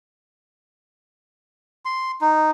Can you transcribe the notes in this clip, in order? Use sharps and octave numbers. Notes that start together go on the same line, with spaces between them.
C6
D#4